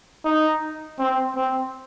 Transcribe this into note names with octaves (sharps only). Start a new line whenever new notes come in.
D#4
C4
C4